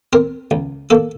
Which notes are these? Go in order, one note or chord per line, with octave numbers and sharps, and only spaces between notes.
C4 A#4
C#2
A#3 A4